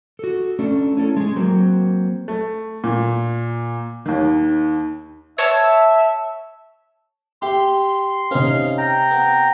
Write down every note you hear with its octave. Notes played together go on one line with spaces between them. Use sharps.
F#4 A4
A3 C#4 D4 A4
C#4 E4 A4
G#3 C#4 G#4
F#3 A#3 C4
A3
A#2
D#2 D#3
C#5 E5 A5 E6
G4 E5 C6
C3 C#4 D#4 C5 F5
G5 A#5
B3